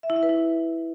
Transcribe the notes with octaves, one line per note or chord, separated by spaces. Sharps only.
E5
E4
E5
B4
E4